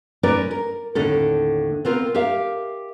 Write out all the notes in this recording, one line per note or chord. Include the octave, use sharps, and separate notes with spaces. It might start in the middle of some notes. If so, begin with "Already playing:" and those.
C#4 D#4 A#4 B4 D5
A#4
D#2 A2 D3 C#4 D#4 A4
B3 C4 F4 A#4
G4 A#4 E5 F5